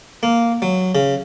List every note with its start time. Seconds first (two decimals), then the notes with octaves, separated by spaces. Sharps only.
0.23 A#3
0.62 F#3
0.95 C#3